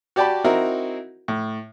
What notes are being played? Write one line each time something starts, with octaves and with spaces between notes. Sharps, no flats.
F#4 G4 D5 G5 A5 B5
C4 D#4 E4 F#4 A#4
A2